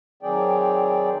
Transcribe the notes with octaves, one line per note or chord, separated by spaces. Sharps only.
D#3 F#3 C4 G#4 D5 G5